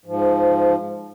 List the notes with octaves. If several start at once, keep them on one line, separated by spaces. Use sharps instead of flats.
G#2 F3